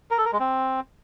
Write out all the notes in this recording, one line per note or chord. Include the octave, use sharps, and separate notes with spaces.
A#4
A4
A#4
G#3
C4